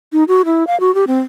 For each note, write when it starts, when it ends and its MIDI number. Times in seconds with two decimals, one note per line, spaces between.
0.13 0.24 63
0.28 0.42 66
0.45 0.66 64
0.67 0.79 77
0.80 0.94 66
0.95 1.05 67
1.07 1.19 60